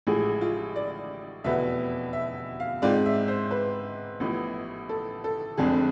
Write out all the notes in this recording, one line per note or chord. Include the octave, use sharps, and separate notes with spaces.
A1 A2 F3 G#3 G#4
F4
D5
F1 E2 B2 B3 E5
E5
F5
G#2 G#3 C4 F4 D5
E5
C5
B4
A1 A2 F3 B3
A4
A4
F1 F2 D3 G#3 C4 G#4